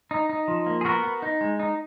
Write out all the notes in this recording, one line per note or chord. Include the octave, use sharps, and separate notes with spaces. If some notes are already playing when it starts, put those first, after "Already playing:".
D#4
D#4
F3
A#3
G#4
B3 F#4 A#4
B3
D#4
G#3
D#4